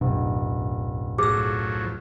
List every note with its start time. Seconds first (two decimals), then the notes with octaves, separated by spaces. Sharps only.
0.01 D1 B1 F#2
1.18 A2 F3 F#3 G#4 E6